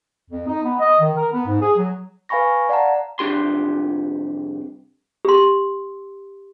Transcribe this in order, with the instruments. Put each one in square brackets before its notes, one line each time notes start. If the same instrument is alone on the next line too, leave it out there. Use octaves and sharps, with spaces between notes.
[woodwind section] F2
D#4
B3
D#5
D#3
A#4
B3
G#2
G#4
F#3
[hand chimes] B4 F5 G#5 B5 C#6 A#6
D5 F5 F#5 A5 A#5
[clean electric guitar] C2 F2 D4 G4 C6
[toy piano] G4 C6